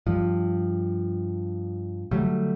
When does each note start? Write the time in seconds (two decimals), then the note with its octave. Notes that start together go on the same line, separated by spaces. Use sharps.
0.06 G2 F3
2.11 D3 F#3 G3 A3